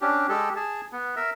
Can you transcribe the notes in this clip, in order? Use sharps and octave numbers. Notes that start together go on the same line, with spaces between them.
C#4 D4 G4
G#3 G4 A4
G#4 A5
B3
A#4 E5